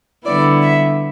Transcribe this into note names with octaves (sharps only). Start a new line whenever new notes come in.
D3 G3 B3 E4 D5
E5